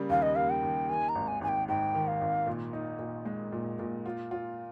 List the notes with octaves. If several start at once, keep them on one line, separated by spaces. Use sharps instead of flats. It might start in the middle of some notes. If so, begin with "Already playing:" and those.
Already playing: C#3 G3 A#3
D#2 F5
D#5
A#3 F5
G5
D#2
D#3 G#5
A#5
G#1
G#5
G#1 G#5
G5
G#2 G5
D#3
F5
G#1
A#2
D#4
A#2
G#3
A#2
A#2
F4
F4